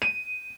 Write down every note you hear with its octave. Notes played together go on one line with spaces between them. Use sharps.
D#7